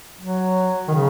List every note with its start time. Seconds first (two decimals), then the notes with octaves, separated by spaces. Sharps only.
0.20 F#3
0.88 D#3
0.94 C#3